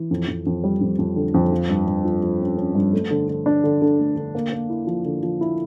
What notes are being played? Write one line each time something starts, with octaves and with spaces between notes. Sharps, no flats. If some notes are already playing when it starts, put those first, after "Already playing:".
Already playing: E3
F2
F2
F2
G3
F2
F2
D3
F2
F3
G2
G2
F3
F3
C#4
C#4
G2
A3
D3
D3
D4
D3
D3
A3
D3
A#3
A#3
E4
F3
D3
F3
E4